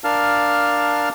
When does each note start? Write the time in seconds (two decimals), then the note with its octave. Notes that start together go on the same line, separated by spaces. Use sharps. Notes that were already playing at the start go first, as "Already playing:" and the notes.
0.04 D4 A#4 F5 A5 F6